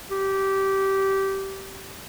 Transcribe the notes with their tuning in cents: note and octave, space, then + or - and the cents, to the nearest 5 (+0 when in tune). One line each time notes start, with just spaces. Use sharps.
G4 -15